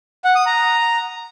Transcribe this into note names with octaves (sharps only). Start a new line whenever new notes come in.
F#5
D#6
A#5